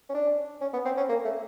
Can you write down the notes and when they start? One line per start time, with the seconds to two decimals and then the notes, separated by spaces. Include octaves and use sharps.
0.10 C#4
0.14 D4
0.61 C#4
0.73 B3
0.85 C4
0.97 C#4
1.09 A#3
1.24 A3